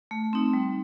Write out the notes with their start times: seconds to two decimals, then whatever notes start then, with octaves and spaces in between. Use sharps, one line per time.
0.11 A3
0.33 C4 D#4
0.53 G3